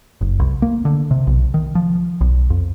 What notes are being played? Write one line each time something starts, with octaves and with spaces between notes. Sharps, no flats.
F#1
C2
A#3
D3
C3
B1
D#3
F3
B1
F2